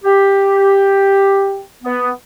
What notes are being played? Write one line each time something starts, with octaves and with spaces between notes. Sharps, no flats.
G4
B3